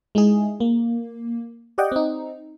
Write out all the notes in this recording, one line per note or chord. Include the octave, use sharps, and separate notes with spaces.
G#3 D#4 E4 G#4
A#3
G4 D5 D#5 F#5 G5
C4 D#4